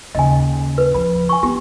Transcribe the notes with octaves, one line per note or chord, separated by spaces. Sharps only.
D#2 C#3 D#5 G#5
B4
F3 B5
G#5 C#6
B3 G4